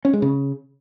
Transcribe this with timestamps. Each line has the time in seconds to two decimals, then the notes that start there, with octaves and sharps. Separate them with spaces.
0.05 C#4
0.13 G#3
0.22 C#3